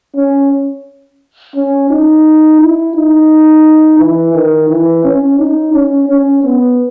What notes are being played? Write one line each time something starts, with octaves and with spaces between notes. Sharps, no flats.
C#4
C#4
D#4
E4
D#4
E3
D#3
E3
C#4
D#4
C#4
C#4
B3